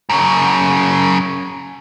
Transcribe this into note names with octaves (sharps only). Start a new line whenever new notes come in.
F#2 C#3